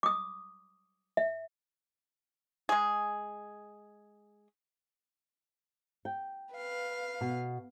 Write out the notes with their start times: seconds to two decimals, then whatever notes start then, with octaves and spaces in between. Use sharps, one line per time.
0.03 D6 D#6
1.17 E5
2.69 G#3 G#4
6.05 G5
6.55 B4 F5
7.21 B2